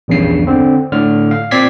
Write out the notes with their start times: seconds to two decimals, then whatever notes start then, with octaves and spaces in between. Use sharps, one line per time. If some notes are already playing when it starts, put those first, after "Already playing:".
0.08 A#1 E2 G2 C#3 C7
0.47 D3 C4
0.92 A2 D3 F6
1.31 F5
1.51 A#2 C4 D5 G#6 B6 C7